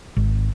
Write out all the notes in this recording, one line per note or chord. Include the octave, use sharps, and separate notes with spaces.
G#1